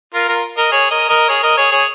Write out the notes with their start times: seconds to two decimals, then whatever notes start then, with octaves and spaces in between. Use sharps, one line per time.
0.14 F4 A#4
0.28 F4 A#4
0.57 A#4 D#5
0.72 G#4 C#5
0.90 A#4 D#5
1.09 A#4 D#5
1.28 G#4 C#5
1.43 A#4 D#5
1.57 G#4 C#5
1.71 G#4 C#5